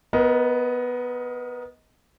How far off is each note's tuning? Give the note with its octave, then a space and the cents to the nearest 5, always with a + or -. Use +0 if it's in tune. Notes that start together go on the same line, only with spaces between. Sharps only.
B3 +0 A#4 +30 D#5 +15